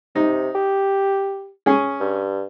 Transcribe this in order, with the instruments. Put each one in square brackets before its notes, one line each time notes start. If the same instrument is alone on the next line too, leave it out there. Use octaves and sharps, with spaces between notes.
[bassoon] C3 [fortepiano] D#4
[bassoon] G4
[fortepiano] C#4 G#4
[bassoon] G2